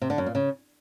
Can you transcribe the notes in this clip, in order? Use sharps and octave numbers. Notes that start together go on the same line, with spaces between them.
C3
D3
F#2
A#2
C#3